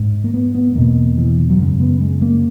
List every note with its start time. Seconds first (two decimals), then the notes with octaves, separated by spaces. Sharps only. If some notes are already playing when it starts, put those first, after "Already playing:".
Already playing: G#2
0.24 A#3
0.34 B3
0.55 B3
0.75 E2 B2 A#3
1.17 E3
1.41 E3
1.50 F#3
1.59 F#2 C#3 G#3
1.80 B3
2.01 G#3
2.22 A#3